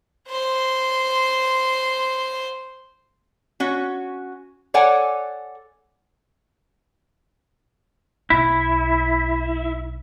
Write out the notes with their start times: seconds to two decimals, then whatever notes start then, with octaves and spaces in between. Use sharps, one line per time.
0.29 C5 C6
3.60 C#4 F#4
4.74 A4 C#5 D5 F#5 G#5
8.30 B1 E4